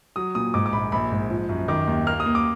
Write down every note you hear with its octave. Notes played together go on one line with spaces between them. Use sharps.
F#3 D#6
A#2 D#6
G#2 D6
D6
A#1 B5
A#1 B5
G#2
F3
F#2
D#3 D6
D#2
A#3 F6
D#6
A#3
D6